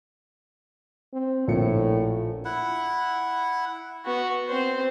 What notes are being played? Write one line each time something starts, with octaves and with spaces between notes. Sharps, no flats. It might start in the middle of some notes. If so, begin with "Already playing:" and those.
C4
A#1 A2 A#4 C#7
E4 F#5
B3 F#4
C4 C5